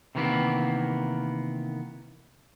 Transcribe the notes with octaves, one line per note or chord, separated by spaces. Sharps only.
C3 D#3 E3 A#3 B3